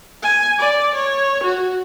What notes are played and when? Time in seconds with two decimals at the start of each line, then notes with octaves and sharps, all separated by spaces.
0.22 G#5
0.58 D5
0.95 C#5
1.43 F#4